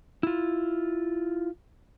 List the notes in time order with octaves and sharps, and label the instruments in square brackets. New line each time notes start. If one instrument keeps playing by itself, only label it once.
[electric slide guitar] E4 F4